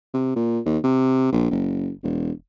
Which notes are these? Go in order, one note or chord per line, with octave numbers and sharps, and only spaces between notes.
C3
A#2
D#2
C3
A#1
F#1
E1